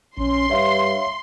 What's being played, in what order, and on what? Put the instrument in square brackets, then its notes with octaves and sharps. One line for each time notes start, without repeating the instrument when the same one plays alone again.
[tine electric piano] A#1 [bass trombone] C#4 [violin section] C6
[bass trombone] G2 [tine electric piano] C#5 E5 F5